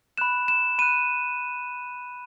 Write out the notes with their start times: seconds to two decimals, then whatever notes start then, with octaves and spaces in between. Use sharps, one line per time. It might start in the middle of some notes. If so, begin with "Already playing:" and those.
0.18 B5 F#6 E7
0.48 E7
0.79 B5 F#6 D#7